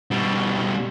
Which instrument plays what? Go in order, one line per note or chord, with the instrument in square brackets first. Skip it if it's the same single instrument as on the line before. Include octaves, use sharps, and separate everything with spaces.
[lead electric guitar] B2 G3